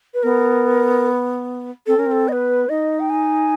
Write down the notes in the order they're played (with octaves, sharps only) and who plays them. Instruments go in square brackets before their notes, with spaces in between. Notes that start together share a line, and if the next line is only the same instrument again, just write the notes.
[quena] B4
[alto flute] B3 [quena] A#4
[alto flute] C4 [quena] A4
[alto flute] C#4 [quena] A#4
[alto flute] C4
[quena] A4
[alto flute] B3 [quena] D#5
[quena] B4
[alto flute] D#4 [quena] D#5
[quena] G5
G#5